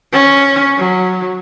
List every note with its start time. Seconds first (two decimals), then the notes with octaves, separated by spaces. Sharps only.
0.13 C#4
0.78 F#3